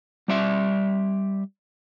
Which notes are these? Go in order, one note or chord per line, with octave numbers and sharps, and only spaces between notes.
G3 D5 E5